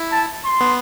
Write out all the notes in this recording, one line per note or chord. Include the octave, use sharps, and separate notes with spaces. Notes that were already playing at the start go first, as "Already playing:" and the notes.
Already playing: E4
A5
C6
B3